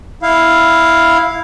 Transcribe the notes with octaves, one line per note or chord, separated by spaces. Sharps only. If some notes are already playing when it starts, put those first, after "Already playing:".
E4 F5